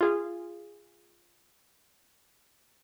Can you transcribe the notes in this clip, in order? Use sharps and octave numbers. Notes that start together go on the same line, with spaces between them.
F4 G#4 F5